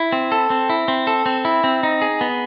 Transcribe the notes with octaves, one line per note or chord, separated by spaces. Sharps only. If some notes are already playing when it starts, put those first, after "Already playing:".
Already playing: E4
C4
A4
C4
E4
C4
A4
C4
E4
C4
D#4
G#4
B3